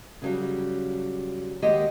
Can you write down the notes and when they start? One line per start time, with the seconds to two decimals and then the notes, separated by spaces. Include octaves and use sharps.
0.22 C#3 F#3 G3
1.62 D#2 D#3 G#3 G4 D#5 F#5